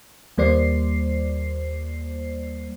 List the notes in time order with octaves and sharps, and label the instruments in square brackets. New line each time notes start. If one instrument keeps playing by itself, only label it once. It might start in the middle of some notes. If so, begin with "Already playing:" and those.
[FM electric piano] D#2 G3 A#3 C5 D5 C7